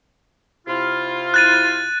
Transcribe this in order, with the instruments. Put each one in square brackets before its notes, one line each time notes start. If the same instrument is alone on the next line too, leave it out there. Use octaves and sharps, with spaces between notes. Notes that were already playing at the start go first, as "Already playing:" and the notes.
[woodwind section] C3 E4 F4
[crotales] F#6 A6 D#7